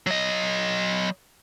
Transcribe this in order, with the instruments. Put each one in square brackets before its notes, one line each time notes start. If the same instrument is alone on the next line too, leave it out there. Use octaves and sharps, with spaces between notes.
[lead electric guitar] F#3 D#5